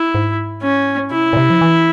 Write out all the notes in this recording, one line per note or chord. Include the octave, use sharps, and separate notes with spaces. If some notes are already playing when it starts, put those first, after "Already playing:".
Already playing: E4
G#2
C#4
C3 E4
A#2
C3
F3
E3